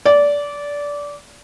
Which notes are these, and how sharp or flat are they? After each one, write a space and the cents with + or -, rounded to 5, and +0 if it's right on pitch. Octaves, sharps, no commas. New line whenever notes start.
D5 -20